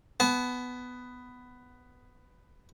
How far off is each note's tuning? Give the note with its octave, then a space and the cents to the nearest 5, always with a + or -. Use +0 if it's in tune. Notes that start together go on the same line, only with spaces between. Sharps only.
B3 +10 A5 -35